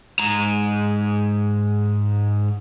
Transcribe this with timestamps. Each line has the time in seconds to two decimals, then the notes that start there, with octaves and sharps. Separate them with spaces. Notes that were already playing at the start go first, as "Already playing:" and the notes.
0.19 G#2 A#5